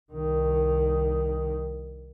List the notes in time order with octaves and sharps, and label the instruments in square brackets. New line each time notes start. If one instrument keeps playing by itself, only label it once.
[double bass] C2 D#3